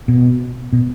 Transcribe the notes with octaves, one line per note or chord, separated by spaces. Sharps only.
B2
B2